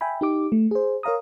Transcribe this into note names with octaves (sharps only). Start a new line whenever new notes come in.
E5 G5 G#5 B5
D#4 G4 D6
A3
G#4 C5
A#4 C#5 F5 A#5 D#6